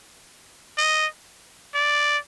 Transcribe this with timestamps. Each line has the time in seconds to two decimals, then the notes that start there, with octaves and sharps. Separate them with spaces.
0.78 D#5
1.74 D5